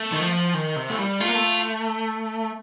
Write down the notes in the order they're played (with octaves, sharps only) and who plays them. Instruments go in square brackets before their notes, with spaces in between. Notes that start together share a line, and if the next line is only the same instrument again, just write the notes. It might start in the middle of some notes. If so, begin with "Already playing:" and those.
Already playing: [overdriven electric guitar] A3
[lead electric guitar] D#3
F3
D#3
C3
A3
G3
[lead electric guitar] A3 [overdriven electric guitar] F4
[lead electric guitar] A#3
A3